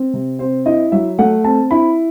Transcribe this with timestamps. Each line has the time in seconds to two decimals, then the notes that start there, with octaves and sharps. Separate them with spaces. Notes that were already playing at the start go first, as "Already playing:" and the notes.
Already playing: C4
0.14 C3
0.39 C4 C5
0.66 E4 D#5
0.92 F#3 E5
1.19 A3 F#5
1.44 C4 A5
1.71 E4 B5